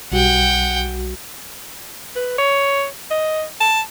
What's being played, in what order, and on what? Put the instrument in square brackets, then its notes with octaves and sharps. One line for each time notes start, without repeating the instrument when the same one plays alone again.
[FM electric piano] B1 G3 F#4 [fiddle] F#5 G5
[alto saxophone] B4
C#5
D#5
A5